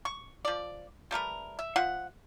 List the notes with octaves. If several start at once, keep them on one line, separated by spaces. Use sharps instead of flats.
C#6
F3 D5
G3 A3 A#4 B4
E5
F3 F4 E5 F#5